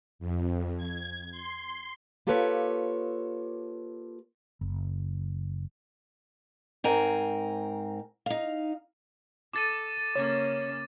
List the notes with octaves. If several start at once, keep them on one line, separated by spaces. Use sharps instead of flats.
F2
G#6
C6
A#3 F4 G4 A4 B4 C#5
F#1
G#2 C4 A#4 G#5
D#4 F5
A4 D6 A6 D#7
C#3 A#3 C#4 C#5 D6 A6